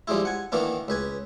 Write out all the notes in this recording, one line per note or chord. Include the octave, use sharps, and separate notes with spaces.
F3 G3 G#3 E4
F#5 G#5
D#3 E3 A#3 B3 D4
C#2 B4 G#5